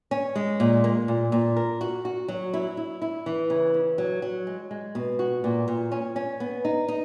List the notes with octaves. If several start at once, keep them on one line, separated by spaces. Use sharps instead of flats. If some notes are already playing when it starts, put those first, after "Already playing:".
C#4
G#3
A#2
A#3
A#2
A#2
A#4
F#4
F#4
F#3
E4
E4
E4
E3
C#3
C#3
F#3
F#3
G#3
G#3
B2
F#4
A#2
A#2
C#4
C#4
B3
D#4
D#4